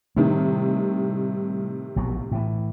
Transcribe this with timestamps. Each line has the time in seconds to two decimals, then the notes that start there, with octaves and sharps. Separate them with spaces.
0.17 A2 C3 D#3 G3
1.96 A#1 B2 F#3
2.32 A2 E3